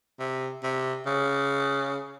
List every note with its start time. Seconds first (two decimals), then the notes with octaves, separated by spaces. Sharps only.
0.19 C3
0.63 C3
1.06 C#3